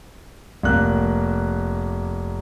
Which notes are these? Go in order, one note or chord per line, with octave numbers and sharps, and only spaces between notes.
F1 A#3 F#6